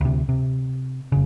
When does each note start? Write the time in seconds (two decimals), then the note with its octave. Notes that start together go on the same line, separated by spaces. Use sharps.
0.01 D2 C3
0.29 C3
1.12 F1 C#3